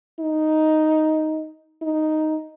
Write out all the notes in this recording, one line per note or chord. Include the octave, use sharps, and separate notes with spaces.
D#4
D#4